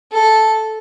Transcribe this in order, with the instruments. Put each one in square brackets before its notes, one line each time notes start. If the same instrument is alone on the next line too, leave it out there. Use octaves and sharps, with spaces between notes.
[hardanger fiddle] A4